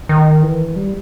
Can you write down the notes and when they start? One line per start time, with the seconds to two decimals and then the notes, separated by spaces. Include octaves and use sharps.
0.09 D#3
0.43 E3
0.76 G3